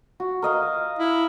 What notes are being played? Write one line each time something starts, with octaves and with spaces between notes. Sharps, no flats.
F#4
A#4 D#5 F5
E4